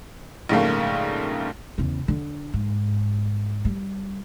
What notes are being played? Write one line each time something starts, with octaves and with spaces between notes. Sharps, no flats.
A#1 G#2 C#3 A3 A#3
E2 C#3
D3
G#2
G3